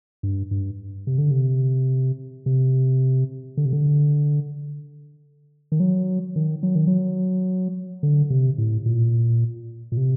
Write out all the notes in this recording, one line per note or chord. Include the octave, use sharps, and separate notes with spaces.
G2
G2
C3
D3
C3
C3
D3
C3
D3
D#3
F#3
D#3
F#3
D#3
F#3
D3
C3
A2
A#2
A#2
C3